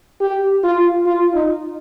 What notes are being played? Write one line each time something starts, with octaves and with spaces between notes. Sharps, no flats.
G4
F4
F4
D#4